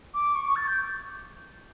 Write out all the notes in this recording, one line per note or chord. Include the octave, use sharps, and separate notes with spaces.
D6
C#6
C#6
A6
G6